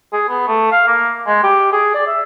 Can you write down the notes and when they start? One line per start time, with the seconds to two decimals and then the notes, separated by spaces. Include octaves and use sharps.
0.13 G#4
0.29 B3
0.48 A3
0.71 F5
0.87 A#3
1.27 G#3
1.43 G4
1.72 G#4
1.94 D5
2.07 E5